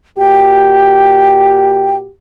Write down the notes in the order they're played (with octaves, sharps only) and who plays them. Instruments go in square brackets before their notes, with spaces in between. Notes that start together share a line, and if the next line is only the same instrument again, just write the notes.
[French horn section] A#2 F#4 G4 [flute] G5